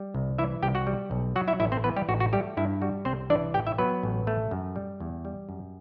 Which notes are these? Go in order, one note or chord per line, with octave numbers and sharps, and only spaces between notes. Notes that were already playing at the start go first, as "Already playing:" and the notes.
Already playing: G3
C2
E3 E4 E5
C2 G4 G5
F#4 F#5
G3
B1
F#3 F#4 F#5
E4 E5
A1 E4 E5
C4 C5
E3 B3 B4
G3 G4
A1 F#4
F#4
G3 A3 G4
G2 E4
G3 F#4
C2 C4 C5
E3 D4 D5
A1 G4 G5
E4 E5
F#3 B3 B4
A1
A3
F#2
G3
E2
G3
F#2